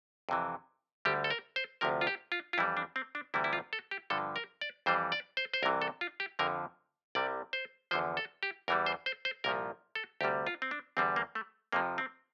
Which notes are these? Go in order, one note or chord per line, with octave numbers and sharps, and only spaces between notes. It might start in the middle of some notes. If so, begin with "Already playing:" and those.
F2 C3 E3
D2 D3 G3 G4
A4
A#4
C5
D2 C3 F3 A#4
F4
G4
F4
F4
F2 E3 G3 E4
D4
C4
D4
D2 C3 E3 G3 E4
E4
F4
A4
G4
G2 D3 F3 A4
A#4
D5
F2 E3 G3 C5
D5
C5
C5
C2 C3 E3 A#4
A4
F4
G4
F2 D3 F3 A#4
C2 C3 G3 D5
C5
E2 D3 F3 C5
A4
G4
E2 E3 G3 A#4
C5
C5
C5
C2 A#2 F3 A#4
A4
D2 C3 G3 G4
F4
C4
D4
E2 D3 G3 C4
A#3
A3
F2 C3 F3 A#3
C4